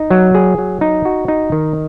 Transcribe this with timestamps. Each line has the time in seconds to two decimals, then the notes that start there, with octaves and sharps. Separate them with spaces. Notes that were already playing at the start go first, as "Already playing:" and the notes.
Already playing: D#4
0.10 F#3
0.35 G#4
0.58 F#3
0.81 D#4
1.05 F#4
1.28 D#4
1.52 D#3